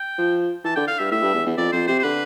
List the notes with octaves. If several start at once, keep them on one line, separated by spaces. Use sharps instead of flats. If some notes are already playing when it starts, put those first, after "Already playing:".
Already playing: G5
F3
E3 A5
D3 G5
F5
G2 E5
A2 E5
G2
E2
E2
F2 D5
F2 C5
C3 C5
C5
D3 B4